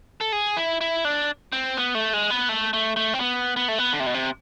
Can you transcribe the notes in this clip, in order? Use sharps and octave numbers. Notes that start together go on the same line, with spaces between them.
A4
G#4
E4
E4
D4
C4
B3
A3
G#3
B3
A3
A3
A3
C4
B3
B3
A3
B3
D3
C3
B2
C3